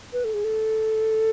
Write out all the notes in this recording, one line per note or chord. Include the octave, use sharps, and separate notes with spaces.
B4
A4
G#4
A4